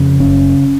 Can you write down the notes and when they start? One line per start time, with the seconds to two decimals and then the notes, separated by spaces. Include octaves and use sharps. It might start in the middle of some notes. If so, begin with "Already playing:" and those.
Already playing: F2 C#3
0.20 F#1 C#4